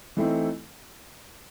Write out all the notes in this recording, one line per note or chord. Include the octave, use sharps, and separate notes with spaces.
E3 A3 C4 D#4